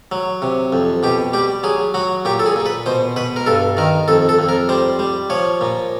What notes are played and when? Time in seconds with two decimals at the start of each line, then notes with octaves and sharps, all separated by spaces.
0.12 F#3
0.42 C3
0.73 F2
1.03 B2 G4
1.33 G3 G4
1.63 F#3 G#4
1.94 F#3 F#4
2.25 A#2 G4
2.39 A4
2.46 G#4
2.56 A#2
2.66 B4
2.86 B2 C5
3.16 B2 B4
3.36 A#4
3.46 G2 A4
3.77 D#3 A#4
4.08 F2 A4
4.29 A4
4.39 F2
4.49 A#4
4.69 G3 C5
4.99 G3
5.30 F3 C#5
5.61 A#2